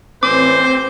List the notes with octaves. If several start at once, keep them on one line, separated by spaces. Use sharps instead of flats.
A1 C4 C#4 B4 C5 D6